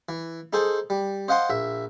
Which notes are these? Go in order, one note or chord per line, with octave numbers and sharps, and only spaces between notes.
E3
D#4 G#4 A4 C5 G#5
G3
C5 D#5 F5 F#5 G#5 C6
A#1 E5